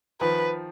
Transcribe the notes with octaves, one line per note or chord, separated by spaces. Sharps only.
D#3 F3 B4